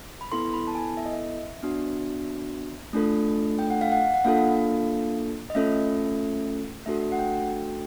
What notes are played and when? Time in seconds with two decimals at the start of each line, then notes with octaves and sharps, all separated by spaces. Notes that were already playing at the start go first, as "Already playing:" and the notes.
0.21 B5
0.32 B3 E4 A4 C6
0.54 B5
0.67 A5
0.75 G#5
0.97 E5
1.06 D#5
1.13 E5
1.63 B3 D4 F#4
2.93 A3 D4 F4 A4
3.59 G5
3.70 F#5
3.81 F5
3.92 F#5
4.14 F#5
4.24 A#3 D4 F4 A4 F5
5.50 D#5
5.55 A3 C#4 F4 A4 E5
6.86 A3 D4 F#4 A4 E5
7.12 F#5
7.19 G5